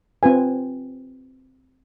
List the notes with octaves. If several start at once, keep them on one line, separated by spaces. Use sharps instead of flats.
C4 F4 B4 G#5